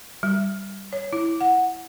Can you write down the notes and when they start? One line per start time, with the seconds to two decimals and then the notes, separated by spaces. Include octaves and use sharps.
0.23 G3
0.93 C#5
1.13 E4
1.41 F#5